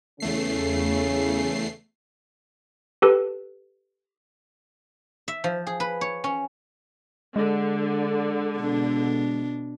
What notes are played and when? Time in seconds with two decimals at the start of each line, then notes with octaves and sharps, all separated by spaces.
0.20 E2 C#3 A3 C#4 C7
3.02 G4 A4 B4
5.28 E5
5.44 F3
5.67 G#4
5.80 B4
6.01 C#5
6.24 C#4
7.36 D3 G#3
8.59 B2 D4